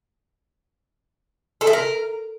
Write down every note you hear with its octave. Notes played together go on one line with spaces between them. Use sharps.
A4
E4
A#4